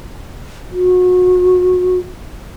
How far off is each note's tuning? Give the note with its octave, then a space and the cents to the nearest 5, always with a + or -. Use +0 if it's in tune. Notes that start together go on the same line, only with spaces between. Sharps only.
F#4 -30